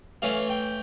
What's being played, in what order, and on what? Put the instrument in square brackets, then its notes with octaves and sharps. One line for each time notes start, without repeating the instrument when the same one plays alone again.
[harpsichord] E3 A3 C#4 F5
G5